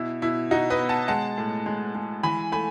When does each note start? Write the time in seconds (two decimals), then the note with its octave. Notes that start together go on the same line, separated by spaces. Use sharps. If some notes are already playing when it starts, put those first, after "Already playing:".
Already playing: B2 E4
0.22 B2 E4
0.51 B2 D#4 F#4
0.70 B4 D#5
0.80 B3
0.89 F#5 A5
1.08 G#3 F#5 A5
1.38 A2
1.66 G#3
1.95 G#3
2.23 E3 G#5 B5
2.52 A3 G#5 B5